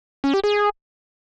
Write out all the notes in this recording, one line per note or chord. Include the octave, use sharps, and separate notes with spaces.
C#4
G4
G#4